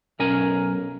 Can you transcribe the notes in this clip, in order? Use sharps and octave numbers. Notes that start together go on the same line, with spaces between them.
B1 C#4 A#4 G#5